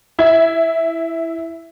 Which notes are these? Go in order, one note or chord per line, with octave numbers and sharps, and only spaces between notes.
E4 E5 G#6